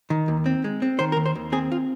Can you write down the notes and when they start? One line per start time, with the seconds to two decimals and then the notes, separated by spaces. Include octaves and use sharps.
0.10 D#3
0.28 D#2
0.46 C4
0.64 G#3
0.82 C4
0.99 D#3 C5
1.12 A#4
1.17 D#2
1.26 C5
1.35 D#2
1.52 C4 G#4
1.72 F4